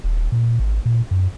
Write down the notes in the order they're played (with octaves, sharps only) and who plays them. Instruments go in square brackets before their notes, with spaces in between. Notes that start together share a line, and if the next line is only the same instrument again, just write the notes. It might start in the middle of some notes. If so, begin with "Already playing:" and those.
[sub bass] D#1
A#2
G#1
A#2
F#2